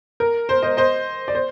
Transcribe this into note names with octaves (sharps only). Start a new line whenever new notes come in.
A#4
C5
C5 D#5
C5 D#5
D5
C5